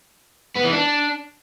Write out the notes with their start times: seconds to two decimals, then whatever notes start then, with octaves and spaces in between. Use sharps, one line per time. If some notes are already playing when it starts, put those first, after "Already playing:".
0.57 B3
0.65 E3
0.73 D4